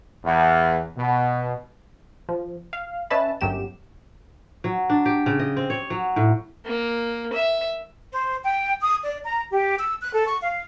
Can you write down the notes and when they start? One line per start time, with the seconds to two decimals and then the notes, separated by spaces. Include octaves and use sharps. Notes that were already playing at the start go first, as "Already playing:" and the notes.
0.24 E2
0.96 B2
2.29 F3
2.73 F5
3.10 C#4 B4 D#5 E5 A5 B5
3.41 G1 F#2 F#3 G4 E7
4.64 F#3
4.90 D4
5.06 G4
5.26 C#3
5.39 D#5
5.57 C4
5.70 C#5
5.90 F#3
6.16 A2
6.65 A#3
7.33 E5
8.13 C5
8.43 G5
8.81 D#6
9.04 D5
9.24 A#5
9.50 G4
9.79 E6
10.01 F#6
10.13 A4
10.27 C#6
10.42 F5